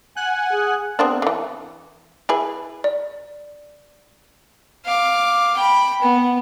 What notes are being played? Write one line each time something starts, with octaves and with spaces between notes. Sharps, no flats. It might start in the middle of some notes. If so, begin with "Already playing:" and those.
F#5 G#5 F#6
G#4
B3 C4 D4
D3 E3
E4 G#4 B4
D5
F5 D6
G5 B5
B3